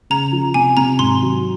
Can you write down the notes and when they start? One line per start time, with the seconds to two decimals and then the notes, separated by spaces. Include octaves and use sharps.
0.10 C#3 A#5
0.32 F3
0.54 C3 G#5
0.77 C3 A#5
0.99 G#1 C6
1.22 F#3